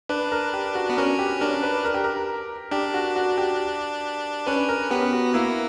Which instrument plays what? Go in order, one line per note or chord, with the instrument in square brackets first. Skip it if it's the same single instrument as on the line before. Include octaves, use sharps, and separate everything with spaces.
[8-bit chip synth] D4 [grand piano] B4
[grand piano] A#4
G4
F#4
[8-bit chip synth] B3
[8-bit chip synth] C#4 [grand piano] A#4
[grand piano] G4
[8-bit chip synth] D4 [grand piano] A#4
[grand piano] B4
A#4
G4
A#4
[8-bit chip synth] D4 [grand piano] G4
[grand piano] F#4
F#4
G4
[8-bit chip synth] C#4 [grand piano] B4
[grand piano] A#4
[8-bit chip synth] B3 [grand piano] G4
[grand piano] F#4
[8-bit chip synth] A#3 [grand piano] E4